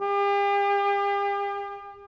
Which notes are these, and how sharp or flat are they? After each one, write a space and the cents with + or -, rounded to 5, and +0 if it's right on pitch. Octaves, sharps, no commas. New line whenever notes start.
G4 +40